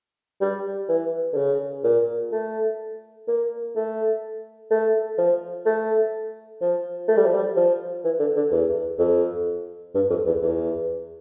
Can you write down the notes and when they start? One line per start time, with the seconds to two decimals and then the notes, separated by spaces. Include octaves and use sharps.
0.41 G3
0.89 E3
1.33 D3
1.37 C#3
1.84 A#2
2.32 A3
3.28 A#3
3.75 A3
4.71 A3
5.18 F3
5.66 A3
6.61 F3
7.08 A3
7.17 G3
7.26 F3
7.34 G3
7.56 F3
8.04 E3
8.19 D3
8.36 D3
8.51 E2
8.99 F2
9.95 G2
10.10 F2
10.26 E2
10.42 E2